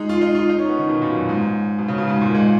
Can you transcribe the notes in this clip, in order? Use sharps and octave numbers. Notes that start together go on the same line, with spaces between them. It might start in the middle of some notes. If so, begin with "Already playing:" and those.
Already playing: G#3 D#4
F4
D#4
F4
D#4
C#4
B3
D#3
B2
A#2
F#2
G#2
B2
C#3
B2
G#2
A#2
G#3